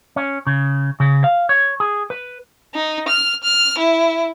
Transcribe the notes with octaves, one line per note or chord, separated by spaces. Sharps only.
C#4
C#3
C#3
F5
C#5
G#4
B4
D#4
F6
F6
E4